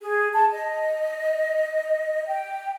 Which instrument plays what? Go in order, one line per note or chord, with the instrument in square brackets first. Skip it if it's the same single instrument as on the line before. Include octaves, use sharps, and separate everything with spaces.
[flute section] G#4
A5
D#5
G5